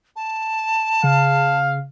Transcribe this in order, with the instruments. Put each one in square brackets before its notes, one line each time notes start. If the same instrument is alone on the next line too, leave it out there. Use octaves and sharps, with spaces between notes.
[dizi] A5
[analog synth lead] C#3 [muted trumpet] F5